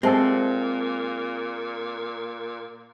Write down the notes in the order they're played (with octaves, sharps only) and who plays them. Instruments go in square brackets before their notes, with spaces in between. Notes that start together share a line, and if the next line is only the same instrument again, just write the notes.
[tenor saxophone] A#2 [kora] G#3 A4 [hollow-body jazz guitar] C4 [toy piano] E5 A5